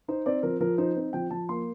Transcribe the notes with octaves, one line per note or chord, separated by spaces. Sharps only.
D#4 C5
C4 D5
F3 A#4
F3 A#4
D#4 C5
C4
F3 G5
F3 A5
A#3 C6